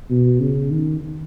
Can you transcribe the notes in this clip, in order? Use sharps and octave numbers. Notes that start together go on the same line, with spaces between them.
B2
C#3
D#3